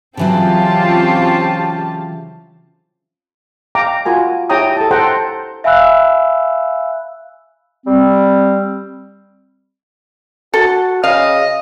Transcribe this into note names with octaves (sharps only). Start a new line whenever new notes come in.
C#3 E3 F#3 C4 C#4 F4 G4 A5
F5 G5 A#5 D6
F4 F#4 A#4 G#5
E4 G4 C#5 G5 A#5 D#6
A4 A5
A4 C5 F#5 G5 A#5
E5 F5 G#5 B5 E6 F#6
G3 C4
F#4 A4
C#3 D#5 F5